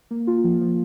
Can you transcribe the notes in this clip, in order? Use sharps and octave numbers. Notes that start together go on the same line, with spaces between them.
A#3
F4
F3
F3